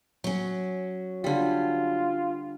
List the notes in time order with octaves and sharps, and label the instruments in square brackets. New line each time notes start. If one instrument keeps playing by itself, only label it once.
[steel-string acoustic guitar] F#3 C#4
[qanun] D3 G3 [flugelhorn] F4